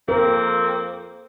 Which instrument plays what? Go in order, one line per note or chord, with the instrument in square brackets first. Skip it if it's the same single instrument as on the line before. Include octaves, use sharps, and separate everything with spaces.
[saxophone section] F2 A#3 C4 [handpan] A#4